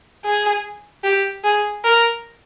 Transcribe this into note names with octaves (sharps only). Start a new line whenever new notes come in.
G#4
G4
G#4
A#4